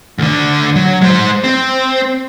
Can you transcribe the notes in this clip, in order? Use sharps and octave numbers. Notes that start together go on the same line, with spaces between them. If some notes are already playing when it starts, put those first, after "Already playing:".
D2 D3
F#3
G#3 C5
C4